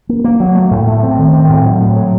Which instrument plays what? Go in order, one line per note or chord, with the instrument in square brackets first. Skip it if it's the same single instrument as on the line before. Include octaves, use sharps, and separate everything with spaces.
[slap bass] A#3
A#3
F#3
A3
A2
A3
C4
D#3
C4
A2
F#3
A2
F#3